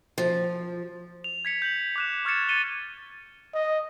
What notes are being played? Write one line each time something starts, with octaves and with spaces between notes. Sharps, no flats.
F3
F7
G#6 B6 C#7 F7
G6 F#7
D6 F#6 E7
C#6 F6 G#6 A6 C#7 E7
G#6 A6 C#7 D#7 G7
D#5